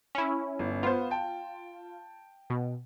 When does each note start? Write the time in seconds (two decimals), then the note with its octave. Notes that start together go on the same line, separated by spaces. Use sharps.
0.15 C#4 E4
0.59 G1
0.83 B3 F4 C5
1.10 G5 A5
2.50 B2